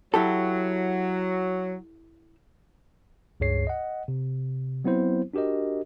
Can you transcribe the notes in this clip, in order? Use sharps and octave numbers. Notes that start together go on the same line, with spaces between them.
F#3 E4 G4 A4
C#2 G2 G#4 C#5 C7
D#5 F#5
C3
F#3 B3 C4 E4 C5
D4 F#4 G4 A#4 D#5